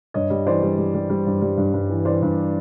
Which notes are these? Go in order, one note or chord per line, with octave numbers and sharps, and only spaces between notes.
G2 C#5 D#5
G3
E3 C5 D5
G3
G3
G3
G3
G2
G3
G2
G2
E3
E3 C5 D5
G2